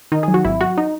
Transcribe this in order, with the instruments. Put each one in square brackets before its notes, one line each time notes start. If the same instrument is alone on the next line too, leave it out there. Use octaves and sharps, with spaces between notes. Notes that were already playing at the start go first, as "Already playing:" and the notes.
[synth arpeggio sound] D#3 D#4
F#3 G#4
F#4
G#1 E4
F#3 F#4
D#4